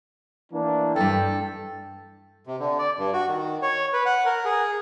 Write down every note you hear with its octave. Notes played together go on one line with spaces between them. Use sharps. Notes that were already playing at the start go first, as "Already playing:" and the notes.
E3 A3 A#3 D4
E2 G2 A4 G5
C3
D3
D5
G2
F#4
D#3
C#5
B4
F#5
A#4
G#4